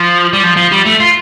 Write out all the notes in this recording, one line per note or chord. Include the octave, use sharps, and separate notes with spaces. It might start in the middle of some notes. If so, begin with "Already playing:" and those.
Already playing: F3
G3
F3
F3
G3
A3
F4